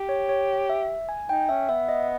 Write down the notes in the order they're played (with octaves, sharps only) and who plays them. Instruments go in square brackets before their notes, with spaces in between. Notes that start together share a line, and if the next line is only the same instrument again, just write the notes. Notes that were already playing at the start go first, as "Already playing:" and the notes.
Already playing: [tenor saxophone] G4
[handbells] C#5
C#5
E5
G#5
[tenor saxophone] D#4 [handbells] G5
[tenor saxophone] C#4 [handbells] E5
[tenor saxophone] B3 [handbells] E5
[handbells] D#5